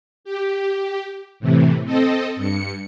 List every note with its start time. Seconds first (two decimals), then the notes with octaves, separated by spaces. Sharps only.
0.24 G4
1.40 A2 C3 E3
1.85 C4 A4 D#5
2.36 G2 C#7